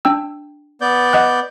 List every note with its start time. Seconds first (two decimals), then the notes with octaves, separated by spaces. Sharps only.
0.05 D4 G5 E6
0.81 B3 D5 G6
1.13 D#5 F#5 F#6